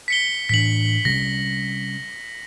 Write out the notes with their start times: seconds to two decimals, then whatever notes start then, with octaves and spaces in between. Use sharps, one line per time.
0.08 B6 C#7 G7
0.49 A2 E3 D4 B6 F#7
1.05 C3 G3 C#4 A#6